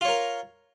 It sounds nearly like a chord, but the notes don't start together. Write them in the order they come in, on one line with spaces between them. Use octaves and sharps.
F4 C#5 A#4